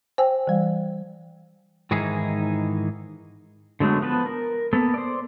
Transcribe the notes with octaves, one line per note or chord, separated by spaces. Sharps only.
C5 G5 G#5 E6
E3 G3
G#2 D#3 E3 D#4 E4 G#4
D3 F#3 G#3 A3 B3
F3 B3 B4 A5
A#4
A#3 B3 A4
C5 D5